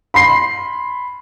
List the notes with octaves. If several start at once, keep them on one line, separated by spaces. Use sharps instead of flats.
B5 C6 C7